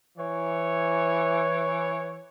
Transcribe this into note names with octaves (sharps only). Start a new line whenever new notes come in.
E3 C#5